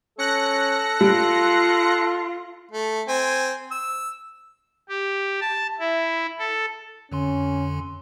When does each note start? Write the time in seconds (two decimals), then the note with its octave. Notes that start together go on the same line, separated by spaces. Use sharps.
0.19 C#4 A4 F#6 A#6 C#7
1.01 G3 F4
2.71 A3
3.08 C4 G#5
3.71 E6
4.89 G4
5.41 A5
5.79 E4
6.39 A4
7.12 F2 D3 C#4 C6